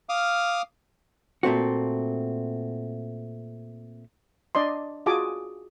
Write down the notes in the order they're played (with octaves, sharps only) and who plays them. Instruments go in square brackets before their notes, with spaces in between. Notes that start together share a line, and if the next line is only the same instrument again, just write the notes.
[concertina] F5 D6 D#6 F6
[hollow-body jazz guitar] A#2 A3 C4 F#4
[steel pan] D4 D5 D#5 C6
F4 F#4 G#4 G#5 A5 D6